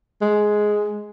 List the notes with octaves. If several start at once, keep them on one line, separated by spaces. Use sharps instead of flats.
G#3